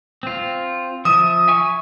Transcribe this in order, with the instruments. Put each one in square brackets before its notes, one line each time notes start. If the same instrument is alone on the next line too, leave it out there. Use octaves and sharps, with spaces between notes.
[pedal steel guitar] C4 F4
[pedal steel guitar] F3 E5 [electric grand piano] D#6
[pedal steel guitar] E5 G#5 C#6